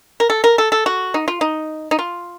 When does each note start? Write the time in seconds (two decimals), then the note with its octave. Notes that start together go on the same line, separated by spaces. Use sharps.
0.20 A#4
0.30 A4
0.44 A#4
0.58 A4
0.72 A4
0.86 F#4
1.14 D#4
1.28 F4
1.41 D#4
1.91 D#4
1.99 F4